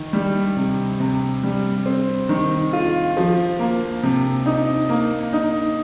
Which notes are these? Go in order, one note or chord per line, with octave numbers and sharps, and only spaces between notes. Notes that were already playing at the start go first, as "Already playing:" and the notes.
Already playing: D#3
G3
C3
C3
G3
C4
D#3
F4
F3
A#3
C3
D#4
A#3
D#4